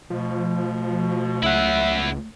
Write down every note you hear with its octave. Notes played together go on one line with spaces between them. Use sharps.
B2 F3 A3
C#2 F#3 E4 E5 F#5